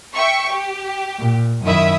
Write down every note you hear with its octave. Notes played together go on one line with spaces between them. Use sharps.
E5 G5 C#6
G4
A#2
F#2 D#3 E4 E5 D#6